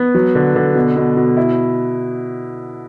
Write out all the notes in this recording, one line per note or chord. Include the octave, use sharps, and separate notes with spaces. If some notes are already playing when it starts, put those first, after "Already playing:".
Already playing: B3
F#3
D3
D3
B2
B2
B2
E4